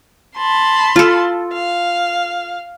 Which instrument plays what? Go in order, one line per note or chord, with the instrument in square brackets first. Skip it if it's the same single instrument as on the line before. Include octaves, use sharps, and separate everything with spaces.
[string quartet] A5 B5 C6
[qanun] F4 A4
[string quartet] F5